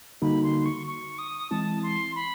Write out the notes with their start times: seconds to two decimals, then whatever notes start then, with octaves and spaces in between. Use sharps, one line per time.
0.22 D3 G3 A#3 D#4 F#4 B5
0.43 C6
0.65 C#6
0.87 C#6
1.19 D#6
1.50 E3 G#3 C4 E4 A5
1.83 C6
2.16 B5